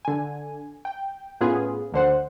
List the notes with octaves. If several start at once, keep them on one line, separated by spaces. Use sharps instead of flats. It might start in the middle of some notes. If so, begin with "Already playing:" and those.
D3 G#5
G5
A2 B3 C#4 F4 G#4
D2 D3 C5 F#5